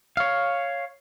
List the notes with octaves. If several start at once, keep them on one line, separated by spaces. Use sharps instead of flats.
C#5 F5